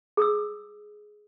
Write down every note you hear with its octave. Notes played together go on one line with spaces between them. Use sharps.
G#4 D#6 E6